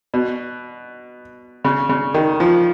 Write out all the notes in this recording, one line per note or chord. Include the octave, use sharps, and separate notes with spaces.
B2
C#3
C#3
D#3
F3